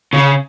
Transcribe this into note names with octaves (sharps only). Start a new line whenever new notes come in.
C#3